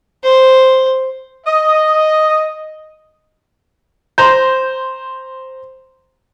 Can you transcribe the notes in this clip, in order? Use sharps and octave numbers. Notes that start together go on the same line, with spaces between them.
C5
D#5
C5 A#5 C6 G6